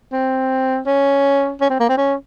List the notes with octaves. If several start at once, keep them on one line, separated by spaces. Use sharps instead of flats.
C4
C#4
C#4
C4
A#3
C4
C#4